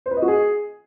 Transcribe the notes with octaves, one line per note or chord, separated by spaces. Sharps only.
C5
B4
D#5
F#4
G#4